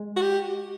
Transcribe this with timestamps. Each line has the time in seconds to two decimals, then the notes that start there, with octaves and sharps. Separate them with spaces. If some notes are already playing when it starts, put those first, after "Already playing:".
Already playing: G#3
0.16 F#4
0.22 G4